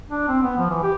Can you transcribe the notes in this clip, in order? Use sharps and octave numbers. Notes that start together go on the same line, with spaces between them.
D4
C4
B3
F3
E3
G4